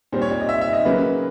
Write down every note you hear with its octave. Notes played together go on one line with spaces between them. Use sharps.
A#2 G3 C4 C5
C#5
D5
D#5
E5
E5
D#5
C#3 F#3 A#3 C#4 B4